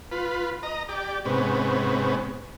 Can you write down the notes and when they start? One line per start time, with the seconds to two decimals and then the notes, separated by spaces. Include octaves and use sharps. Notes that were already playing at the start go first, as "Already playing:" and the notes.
0.12 F4 B4
0.63 D#5 A#5
0.89 G4 D5
1.25 G#2 C3 B3 C#4